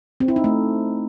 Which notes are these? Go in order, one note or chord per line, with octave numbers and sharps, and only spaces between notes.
C4
E4
D#4
A3